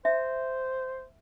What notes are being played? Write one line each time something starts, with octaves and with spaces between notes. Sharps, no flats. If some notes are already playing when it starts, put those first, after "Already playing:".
C5 E5